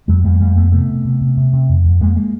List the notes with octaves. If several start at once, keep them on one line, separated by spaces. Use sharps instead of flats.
F2 F#3 G#3
F2 G3 A3
A#3
F2 G3 A3
F2 A3 B3
C3 A3 B3
C3
C3
C3
C3
C3
F2
F2
F2 G#3 A#3
G#3 A#3